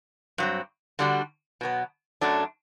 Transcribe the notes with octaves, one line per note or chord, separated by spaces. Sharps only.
G2 F#3 C4
D3 G3 D4 F#4
B2 F#3 B3
F#2 F#3 A3 D4